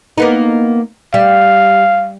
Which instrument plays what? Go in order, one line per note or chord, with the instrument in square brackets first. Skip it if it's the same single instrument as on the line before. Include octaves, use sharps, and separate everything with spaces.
[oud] A#3 B3 D#4
[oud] G3 [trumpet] F5